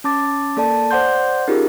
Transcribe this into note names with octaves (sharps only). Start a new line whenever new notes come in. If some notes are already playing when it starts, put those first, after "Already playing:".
C#4 A5 D6 A6
A#3 A4 D5 A5
C5 D5 F#5 C6 G6
C#4 D#4 F4 G4 G#4 A#4